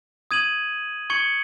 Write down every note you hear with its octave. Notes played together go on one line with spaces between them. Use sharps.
D#6 G#6 D#7 F#7
C#6 G#6 C#7 F#7